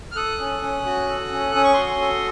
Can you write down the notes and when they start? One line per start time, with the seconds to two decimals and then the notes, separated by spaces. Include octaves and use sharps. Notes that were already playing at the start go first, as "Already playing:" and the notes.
0.12 F6
0.16 A4 D#6 F#6
0.40 C#4
0.62 C#4
0.86 F#4
1.08 A4
1.32 C#4
1.55 C#4 D#6
1.64 C#6
1.74 F#4 C6 D#6
2.01 A4